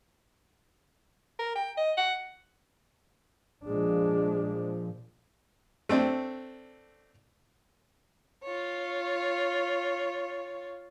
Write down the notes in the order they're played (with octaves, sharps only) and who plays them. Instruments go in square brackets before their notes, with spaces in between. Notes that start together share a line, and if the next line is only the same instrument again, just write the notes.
[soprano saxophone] A#4
G5
D#5
F#5
[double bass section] A#2 F3 [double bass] G#3 D4
[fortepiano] A3 C4 D4
[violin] F4 C#5